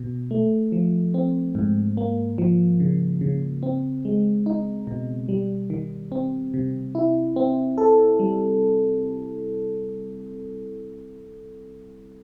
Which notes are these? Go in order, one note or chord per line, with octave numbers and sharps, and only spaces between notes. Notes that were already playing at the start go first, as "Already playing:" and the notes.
Already playing: B2
A3
F3
C4
G#2
A#3
F3
C#3
C#3
C4
G#3
D#4
B2
G3
D#3
C4
C3
E4
C4
A4
G3